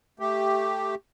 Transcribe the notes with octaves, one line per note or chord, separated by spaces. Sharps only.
A3 G4